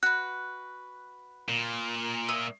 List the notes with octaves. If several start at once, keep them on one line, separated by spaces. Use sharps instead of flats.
F#4 B4 F#6
A#2
C#5 E5 D#6